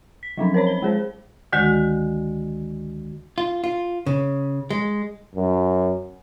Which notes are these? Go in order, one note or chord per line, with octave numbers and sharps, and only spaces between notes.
B6
F3 F#3 C4 C#4
A#4 C5 C#5 B5
G7
G#3 G#4 C5
D2 D3 D#3 G#3 F#4
F4
F4
C#3
G#3
F#2